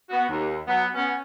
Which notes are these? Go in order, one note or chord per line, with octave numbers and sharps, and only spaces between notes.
B3 F#4
D#2
F#3 B3
B3 C#4